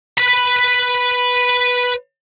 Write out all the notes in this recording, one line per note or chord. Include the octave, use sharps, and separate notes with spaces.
B4 B5